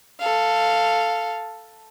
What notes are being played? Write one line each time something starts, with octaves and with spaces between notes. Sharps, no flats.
A4 F5